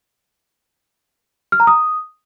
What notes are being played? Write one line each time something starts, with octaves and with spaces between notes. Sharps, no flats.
F6
A#5
D#6